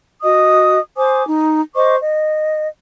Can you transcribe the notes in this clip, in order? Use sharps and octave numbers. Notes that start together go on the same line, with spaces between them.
F#4 D#5 D#6
C5 G#5 D6 D#6
D#4
C5 D#5 C#6 D6
D#5